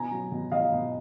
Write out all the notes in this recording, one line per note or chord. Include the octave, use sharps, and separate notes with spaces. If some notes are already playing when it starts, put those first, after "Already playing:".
Already playing: B2 G#5 A#5
F#3
B2
B2 D#5 F5
B2